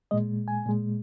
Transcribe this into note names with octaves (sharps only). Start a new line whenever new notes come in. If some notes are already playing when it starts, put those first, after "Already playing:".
A#2 G#3 D#5
G#5
A#2 G#3